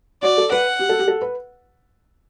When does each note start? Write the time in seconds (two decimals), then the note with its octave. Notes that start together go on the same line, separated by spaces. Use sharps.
0.23 F#4 D5
0.38 A4
0.52 B4 F#5
0.79 G4
0.89 A4
0.99 G4
1.08 A4
1.22 B4